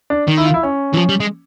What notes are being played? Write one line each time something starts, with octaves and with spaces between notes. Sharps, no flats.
D4
D#3
E4
F4
E4
C#4
E3
F3
G3
G#3